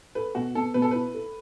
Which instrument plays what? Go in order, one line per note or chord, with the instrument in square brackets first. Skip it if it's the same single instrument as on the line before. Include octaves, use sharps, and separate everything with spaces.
[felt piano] A4 [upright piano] B4
[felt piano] B2 [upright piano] F#4
[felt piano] B3 [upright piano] A4
[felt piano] B2 [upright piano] B4
[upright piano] A4
[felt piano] E4 [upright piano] B4
[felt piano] A4